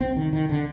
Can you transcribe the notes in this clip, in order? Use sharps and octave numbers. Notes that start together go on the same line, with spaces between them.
C2 C3 C4
D#3
D#3
D3